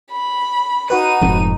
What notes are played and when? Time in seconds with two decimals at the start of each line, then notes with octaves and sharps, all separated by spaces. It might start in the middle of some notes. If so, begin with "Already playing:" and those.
0.11 B5
0.90 D#4 F#4 B4 D#7
1.21 F1 F2 G#2